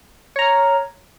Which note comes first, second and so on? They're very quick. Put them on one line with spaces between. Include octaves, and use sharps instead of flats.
C#5 A#5 F6